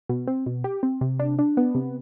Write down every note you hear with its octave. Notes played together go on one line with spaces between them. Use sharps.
B2
C4
B2
G4
C4
C3
D4
D4
B3
C3